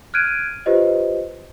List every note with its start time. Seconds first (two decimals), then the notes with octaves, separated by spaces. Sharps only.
0.14 F6 F#6 G#6 D7 D#7
0.66 F4 G4 B4 C5 D#5